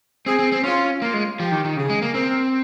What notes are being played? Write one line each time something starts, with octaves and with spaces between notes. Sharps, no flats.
C4 G#4
C4
C4
C#4 F4
A#3 F4
G#3
F3 G4
D#3
D#3
C#3 G#4
G#3
A#3
C4 A#4